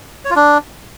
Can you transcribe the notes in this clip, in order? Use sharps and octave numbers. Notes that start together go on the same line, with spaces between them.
C#5
F4
D4